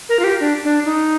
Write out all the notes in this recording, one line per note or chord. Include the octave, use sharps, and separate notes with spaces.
A#4
F4
G4
D4
D4
D#4